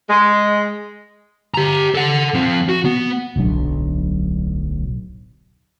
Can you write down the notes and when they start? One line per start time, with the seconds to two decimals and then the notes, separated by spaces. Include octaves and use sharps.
0.08 G#3
1.54 G4 A#5
1.95 A4 F#5
2.34 F3 C4
2.69 F#4
2.85 B3
3.36 D1 B1 F#3 D4